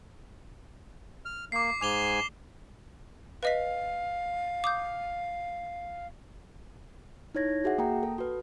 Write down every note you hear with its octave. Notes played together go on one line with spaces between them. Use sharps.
F6
A#3 D6 C7
G#2 G#5 D6 F7 G7
B4 D#5 F5 B6
D6 D#6 G6
D#4 E4 C#5 G#6 A#6
F#4 G#4 E5 F#5
A#3 G5 A#5
A4
F#4 B4